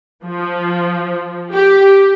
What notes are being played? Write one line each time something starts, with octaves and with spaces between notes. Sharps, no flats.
F3
G4